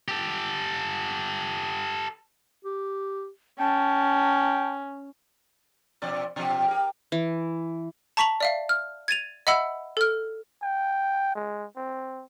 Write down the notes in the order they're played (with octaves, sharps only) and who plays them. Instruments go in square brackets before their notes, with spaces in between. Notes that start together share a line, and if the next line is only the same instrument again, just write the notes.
[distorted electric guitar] G4 A4
[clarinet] G4
[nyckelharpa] C#4 [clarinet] G5 [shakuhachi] A5
[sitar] B2 F3 D5
B2 F3 G4
G4 A#4
[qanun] E3
[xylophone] A5 A#5 C#6 B6 F7 F#7
D5 E5 F5
F6
G#6 A6 D#7 F7
D#5 E5 F#5 B5 E6
A4 F6
[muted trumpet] G5
G#3
C4